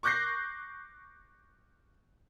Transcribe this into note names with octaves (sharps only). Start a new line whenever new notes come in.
C#6 D6 F#6 G6 A#6 C7